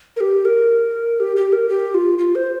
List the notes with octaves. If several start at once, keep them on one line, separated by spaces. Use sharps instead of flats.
A#4
G4
A#4
G4
G4
A#4
G4
F4
F4
C5